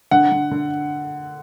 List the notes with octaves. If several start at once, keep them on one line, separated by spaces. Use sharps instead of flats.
D3 F#5
D3
D3